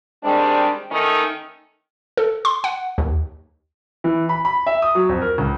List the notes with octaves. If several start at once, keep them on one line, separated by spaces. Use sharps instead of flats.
D#3 G3 G#3 C4 D4
D#3 A3 C#4 D#4
A4
C6
F#5
D#2
E3
B5
B5
E5
D#6
F#3
F2
A#4
C#2